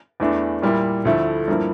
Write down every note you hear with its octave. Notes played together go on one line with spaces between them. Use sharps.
E2 E3 A3 D4
A#2 G3 A#3 E4
D2 D3 F3 A3 E4
G2 F3 A#3 E4